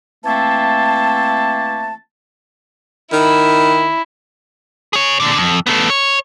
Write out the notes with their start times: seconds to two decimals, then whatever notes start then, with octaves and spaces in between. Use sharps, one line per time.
0.25 E3 A3 A#3 C4 A5
3.12 D#3 E4
4.93 G#4 C#5
5.20 A#2 D3
5.37 F2
5.67 A3 B3
5.90 C#5